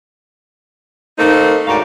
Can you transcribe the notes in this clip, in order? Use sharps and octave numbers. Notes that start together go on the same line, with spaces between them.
D#3 A3 A#3 C4 D#4
D2 G#2 A#4 C#5 D5 F5